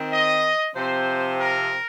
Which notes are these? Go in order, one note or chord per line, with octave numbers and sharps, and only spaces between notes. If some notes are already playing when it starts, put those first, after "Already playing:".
Already playing: D#3 C4
D#5
C3 F3 C4 C5
A#4